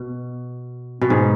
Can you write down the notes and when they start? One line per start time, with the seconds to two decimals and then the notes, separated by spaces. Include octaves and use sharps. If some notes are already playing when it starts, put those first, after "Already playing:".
Already playing: B2
1.01 B2
1.10 G#2